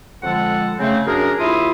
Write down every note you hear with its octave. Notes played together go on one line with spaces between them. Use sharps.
F2 D3 F3 G#3 A4 F#5
C#3 A3 C4
F#2 D4 G#4 A#4
D#2 E4 F4 E5 C6 D#6